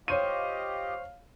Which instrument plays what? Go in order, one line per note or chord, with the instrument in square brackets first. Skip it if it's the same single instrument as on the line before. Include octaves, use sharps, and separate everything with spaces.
[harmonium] F4 G4 D#5 [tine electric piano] C5 C#6 [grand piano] C#5 D#7 [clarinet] F5